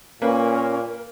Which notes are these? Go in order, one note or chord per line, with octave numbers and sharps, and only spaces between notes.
A#2 A#3 C#4 A#4 B4